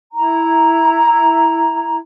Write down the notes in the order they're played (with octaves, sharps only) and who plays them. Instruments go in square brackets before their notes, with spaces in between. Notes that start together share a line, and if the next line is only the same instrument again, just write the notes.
[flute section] E4 A#5